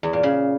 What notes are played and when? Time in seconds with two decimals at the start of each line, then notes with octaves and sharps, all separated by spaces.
0.03 E2
0.13 A#2
0.23 C#3